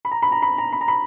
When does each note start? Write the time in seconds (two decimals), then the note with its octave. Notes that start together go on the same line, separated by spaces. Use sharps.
0.05 B5
0.11 A#5
0.22 B5
0.32 A#5
0.42 B5
0.58 A#5
0.72 B5
0.81 A#5
0.88 B5